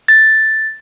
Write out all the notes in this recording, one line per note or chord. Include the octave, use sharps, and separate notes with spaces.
A6